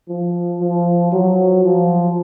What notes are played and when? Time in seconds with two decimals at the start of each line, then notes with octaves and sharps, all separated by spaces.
0.08 F3
0.61 F3
1.13 F#3
1.64 F3